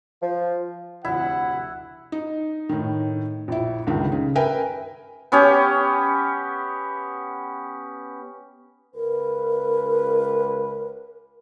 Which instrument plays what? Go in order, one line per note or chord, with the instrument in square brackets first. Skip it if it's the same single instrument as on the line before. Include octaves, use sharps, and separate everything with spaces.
[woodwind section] F3
[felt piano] F1 D2 [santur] E4 [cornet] F#5
[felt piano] D#4
A2 D#3
A#1 E4
C#2 G2 D3 D#3
C#3
A#4 B4 E5 G5 G#5
[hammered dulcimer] B3 C#4 G4
[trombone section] C#2 B4 [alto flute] A#4